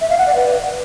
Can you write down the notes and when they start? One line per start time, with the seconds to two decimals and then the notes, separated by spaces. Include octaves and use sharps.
0.01 E5
0.09 F5
0.18 F#5
0.26 D5
0.35 B4